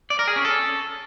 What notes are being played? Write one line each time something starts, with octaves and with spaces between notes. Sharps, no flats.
D5
A#4
G#4
C#4
A4